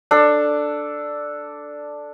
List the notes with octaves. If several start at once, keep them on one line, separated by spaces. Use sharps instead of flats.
D4 A4